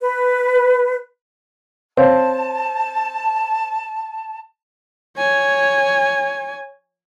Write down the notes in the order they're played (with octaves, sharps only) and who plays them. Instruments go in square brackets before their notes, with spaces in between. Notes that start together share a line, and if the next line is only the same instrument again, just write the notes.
[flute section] B4
[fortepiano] C4 [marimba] C#5 F5 [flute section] A5
[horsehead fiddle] C#5 G#5